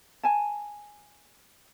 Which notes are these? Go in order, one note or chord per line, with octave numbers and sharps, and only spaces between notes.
G#5 A5